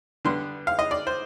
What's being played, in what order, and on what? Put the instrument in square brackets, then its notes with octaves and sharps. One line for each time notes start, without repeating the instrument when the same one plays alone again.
[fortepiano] D3 G3 B3 C6
F5
D#5
D5
C5